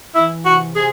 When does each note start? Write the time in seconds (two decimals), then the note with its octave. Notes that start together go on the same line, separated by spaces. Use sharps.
0.14 E3 E4
0.45 C3 F#4
0.75 C3 G#4